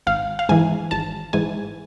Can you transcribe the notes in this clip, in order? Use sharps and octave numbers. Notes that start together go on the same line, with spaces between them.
G#1 F5
F5
G#2 E3 G#5
G#1 A5
G#2 E3 G#5